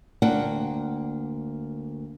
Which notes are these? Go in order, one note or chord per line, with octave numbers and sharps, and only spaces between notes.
D2 A#3 D4 F#5 G5